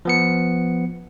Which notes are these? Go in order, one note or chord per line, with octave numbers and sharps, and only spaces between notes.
F3 B3 C#7